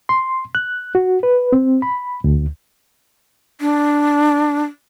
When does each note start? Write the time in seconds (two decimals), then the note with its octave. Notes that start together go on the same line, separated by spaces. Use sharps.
0.09 C6
0.55 F#6
0.95 F#4
1.23 B4
1.52 C4
1.82 B5
2.24 D2
3.60 D4